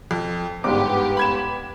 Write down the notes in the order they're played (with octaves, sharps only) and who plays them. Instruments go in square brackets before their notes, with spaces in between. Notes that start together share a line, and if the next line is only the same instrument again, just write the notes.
[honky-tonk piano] F2
[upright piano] G1 G#2 [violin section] B3 G4 [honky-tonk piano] D6
[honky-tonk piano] B5 G#6 E7